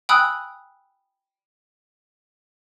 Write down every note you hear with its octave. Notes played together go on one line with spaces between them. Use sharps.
G5 G#5 B5 D#6 E6 F#6